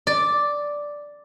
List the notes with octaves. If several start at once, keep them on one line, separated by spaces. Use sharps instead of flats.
D5